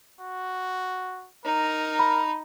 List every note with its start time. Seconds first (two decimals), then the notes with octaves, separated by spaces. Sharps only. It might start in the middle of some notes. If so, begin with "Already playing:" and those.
0.20 F#4
1.45 D#4 A#4
1.99 B5